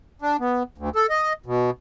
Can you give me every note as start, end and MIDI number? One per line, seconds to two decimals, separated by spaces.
0.22 0.37 62
0.40 0.63 59
0.78 0.89 38
0.95 1.06 69
1.10 1.33 75
1.46 1.70 47